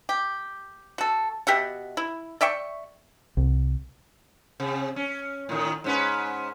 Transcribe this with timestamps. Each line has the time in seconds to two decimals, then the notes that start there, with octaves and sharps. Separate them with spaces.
0.09 G4
0.98 F#4 A4
1.47 B2 G4 E5 F#5
1.97 E4
2.41 D5 E5 G5 C#6
3.37 C2
4.60 C3
4.96 C#4
5.49 A2 D#3
5.84 G#2 C#4 B4